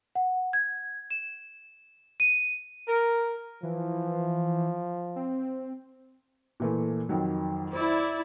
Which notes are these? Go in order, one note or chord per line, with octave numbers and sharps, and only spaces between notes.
F#5
G#6
E7
D#7
A#4
E3 F3
C4
A#2 E3 A3
F2 D#3 F#3
E4 C5 D5